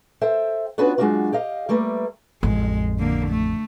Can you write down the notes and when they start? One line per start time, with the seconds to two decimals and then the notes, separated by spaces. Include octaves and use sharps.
0.21 A4 C5 E5 G5
0.78 B3 C#4 D4 F4 F#4 B4
0.98 F#3 G#3 A3 D4 F4 F#4
1.33 G4 D#5 F5
1.69 G3 A3 A#3 B4
2.43 A1 F2 G#3
2.99 D3 A#3
3.29 A3